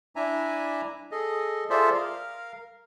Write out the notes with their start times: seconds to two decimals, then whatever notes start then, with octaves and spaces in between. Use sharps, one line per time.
0.16 D4 E4 E5 G#5 A#5
1.11 G#4 A4 D#5
1.70 F4 G#4 A4 C5 D5 E5
1.94 A#4 F5